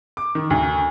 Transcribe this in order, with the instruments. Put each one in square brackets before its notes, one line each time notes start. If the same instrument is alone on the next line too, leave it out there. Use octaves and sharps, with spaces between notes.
[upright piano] D6
D#3
D2